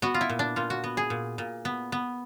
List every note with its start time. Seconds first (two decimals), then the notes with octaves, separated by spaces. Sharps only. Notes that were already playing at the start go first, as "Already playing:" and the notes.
0.02 B3 F#4
0.14 F4
0.21 E4
0.30 A#2
0.39 D4
0.56 A#2 F4
0.70 F#4
0.84 B3
0.97 G#4
1.10 A#2
1.38 A#2
1.65 B3
1.92 B3